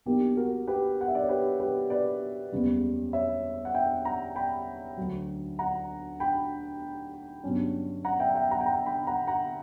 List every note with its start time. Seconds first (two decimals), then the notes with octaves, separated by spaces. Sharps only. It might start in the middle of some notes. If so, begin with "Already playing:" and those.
0.06 B1 B2 A#3 D4 G4
0.37 F#4 A#4
0.67 G4 B4
1.01 F#5
1.08 E5
1.15 D5
1.22 C#5
1.29 G4 B4
1.60 G4 B4
1.90 B4 D5
2.52 F#1 E2 C#3 G3
3.13 C#5 E5
3.65 F#5
3.74 E5 G5
4.05 F#5 A#5
4.36 G5 B5
4.97 D2 D3 F#3
5.59 F#5 A#5
6.20 G5 B5
7.44 G1 G2 F#3 C#4
8.05 F#5 A#5
8.20 E5 G5
8.35 E5 G5
8.51 F#5 A#5
8.61 G5
8.66 F#5 A#5
8.86 G5 B5
9.07 F#5 A#5
9.27 F#5 A#5